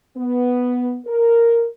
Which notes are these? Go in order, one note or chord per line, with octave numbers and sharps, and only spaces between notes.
B3
A#4